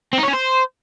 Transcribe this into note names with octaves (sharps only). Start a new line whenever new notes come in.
C4
D#4
C#5
C#4
C5